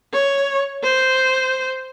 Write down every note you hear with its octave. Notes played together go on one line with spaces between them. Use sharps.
C#5
C5